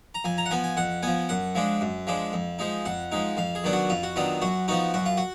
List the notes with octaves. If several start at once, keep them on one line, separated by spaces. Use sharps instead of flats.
A#5
F2 G#5
A#5
F#5
F3 B3 G#5
G#5
F2 F#5
F3 B3 G#5
F#2 F#5
F3 G#3 D4
F#2
F3 G#3 D4
F2
F3 G#3 D#4
F2 F#5
F3 G#3 D#4
F2 F5
G#4
D#3 F#3 B3 D4
F#4
F2 F4
F#4
D#3 F#3 B3 D4 F4
F#2 F#4
F3 B3 D#4 F#4
F#2 F#4
F4
F#4